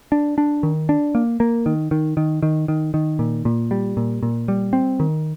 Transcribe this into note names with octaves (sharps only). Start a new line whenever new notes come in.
D4
D4
D#3
D4
A#3
A#3
D#3
D#3
D#3
D#3
D#3
D#3
A#2
A#2
G3
A#2
A#2
G3
C4
D#3